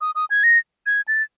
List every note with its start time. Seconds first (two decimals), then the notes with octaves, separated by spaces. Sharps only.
0.01 D#6
0.15 D#6
0.30 G#6
0.44 A#6
0.86 G#6
1.08 A6